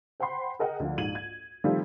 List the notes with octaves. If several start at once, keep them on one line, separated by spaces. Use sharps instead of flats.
C5 F#5 G5 B5 C6
G#4 A#4 D#5 F#5 G5
D2 F3
A#1 G#2 F4 G#6 D#7 F#7
G#6
D#3 F3 G3 A3 C4